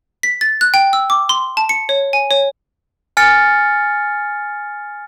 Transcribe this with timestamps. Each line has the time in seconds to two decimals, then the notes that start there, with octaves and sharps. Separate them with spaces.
0.23 B6
0.41 A6
0.61 F#6
0.74 G5
0.93 E6
1.10 D6
1.29 C6
1.57 A5
1.69 C#7
1.89 C#5
2.13 G#5
2.31 C#5
3.17 G#5 F6 A6 C#7